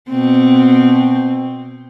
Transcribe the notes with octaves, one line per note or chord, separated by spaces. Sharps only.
B2 C4